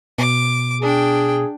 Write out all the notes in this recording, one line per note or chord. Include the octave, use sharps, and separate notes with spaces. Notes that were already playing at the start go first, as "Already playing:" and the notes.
B2 D6
D4 G#4 G5